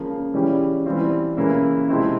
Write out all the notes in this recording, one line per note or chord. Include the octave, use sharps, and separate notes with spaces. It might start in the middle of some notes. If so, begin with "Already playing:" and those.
Already playing: C#3 F3 A#3
C#3 E3 G3 C#4 G4
E3 G3 C4 F4
C#3 E3 A#3 C#4 E4
C3 F3 G#3 C4 E4